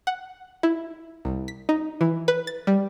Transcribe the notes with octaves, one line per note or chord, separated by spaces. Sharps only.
F#5
E4
C2
B6
D#4
E3
B4
A6
G3